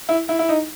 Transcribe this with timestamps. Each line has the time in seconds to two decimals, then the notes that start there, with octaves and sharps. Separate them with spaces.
0.09 E4
0.29 E4
0.39 E4
0.49 D#4